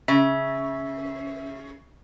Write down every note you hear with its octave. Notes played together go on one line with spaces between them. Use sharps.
C#3 E5